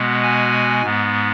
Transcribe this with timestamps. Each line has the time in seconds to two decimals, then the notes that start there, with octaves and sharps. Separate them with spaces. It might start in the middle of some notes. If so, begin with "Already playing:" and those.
Already playing: B2 G#3 B3
0.23 G#5
0.83 G#2 G#3 B3